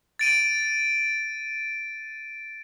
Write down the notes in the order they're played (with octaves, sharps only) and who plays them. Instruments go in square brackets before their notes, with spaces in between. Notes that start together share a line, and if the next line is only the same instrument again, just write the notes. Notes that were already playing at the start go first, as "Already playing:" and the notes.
[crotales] A6 D7 D#7